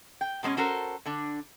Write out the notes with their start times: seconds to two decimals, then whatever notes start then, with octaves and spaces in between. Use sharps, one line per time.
0.21 G5
0.43 B2 G#3 B3 C#4
0.57 C#4 F#4 A4 A#4 C5
1.06 D3 D4